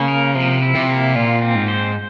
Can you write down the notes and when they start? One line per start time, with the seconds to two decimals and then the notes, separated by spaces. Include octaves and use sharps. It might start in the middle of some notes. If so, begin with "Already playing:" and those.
Already playing: C#3 A#3
0.08 A#4
0.35 C3 F3
0.62 E4
0.75 C3
0.89 A#3
1.15 A#2 F4
1.42 C4
1.55 G#2
1.68 C5